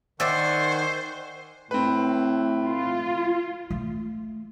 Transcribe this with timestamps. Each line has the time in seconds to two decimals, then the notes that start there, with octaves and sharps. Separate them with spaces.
0.20 D#3 C5 D5 E5 F#5 G#5 C#6
1.71 A2 C4 B4
2.66 F4
3.70 A3